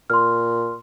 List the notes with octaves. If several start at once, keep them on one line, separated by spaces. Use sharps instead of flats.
A#2 C6 F6